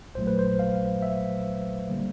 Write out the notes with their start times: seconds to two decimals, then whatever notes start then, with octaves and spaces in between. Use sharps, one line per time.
0.15 A#1 A#2 F#3 A3 C5
0.27 B4
0.39 C5
0.59 F5
1.02 E5
1.90 D3 G3 A#3